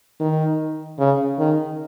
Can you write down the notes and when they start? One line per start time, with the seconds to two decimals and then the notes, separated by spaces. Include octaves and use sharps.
0.20 D#3
0.99 C#3
1.39 D#3